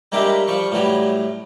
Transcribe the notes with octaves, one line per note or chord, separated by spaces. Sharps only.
G3 G#3 A#3 D4 G4 E5
F3 G3 C#6
A2 E3 F#3 G3